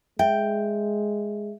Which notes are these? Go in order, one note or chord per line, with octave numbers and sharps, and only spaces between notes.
G#3 E5 G5